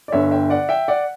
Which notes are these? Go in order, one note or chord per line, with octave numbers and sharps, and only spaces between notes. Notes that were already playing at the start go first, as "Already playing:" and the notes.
D5
G1 G2 D3 C#5 E5
E5 G5
D5 F#5
E5 G5
D5 F#5